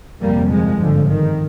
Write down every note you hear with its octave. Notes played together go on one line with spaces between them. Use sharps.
G1 F2 C3 G3 A#3
F3 G#3
G#1 G2 D3 F3
D#3